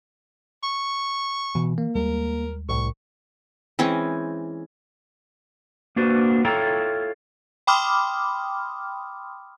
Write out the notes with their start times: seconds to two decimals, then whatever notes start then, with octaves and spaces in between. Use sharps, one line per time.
0.63 C#6
1.55 B2 E3
1.78 A#3
1.95 D#2 G3 G#3 A#4
2.69 C2 A2 C#6
3.79 E3 G#3 C4 C#4
5.96 A#3 D4 F#4 B4 C5
6.45 E4 F4 A4 C#5 G5 A#5
7.67 G5 B5 C6 D6 D#6 F6